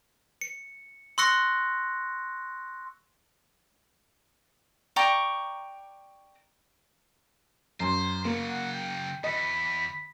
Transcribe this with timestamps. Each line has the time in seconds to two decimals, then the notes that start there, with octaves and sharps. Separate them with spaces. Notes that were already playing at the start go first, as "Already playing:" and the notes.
0.41 C#7
1.18 C6 C#6 E6 F#6 A#6 C#7
4.96 D5 G5 A#5 C#6
7.80 F#2 C5 C6
8.25 C#3 F#3 A#3
8.48 F#5
8.73 G5
9.24 E2 D#5 B5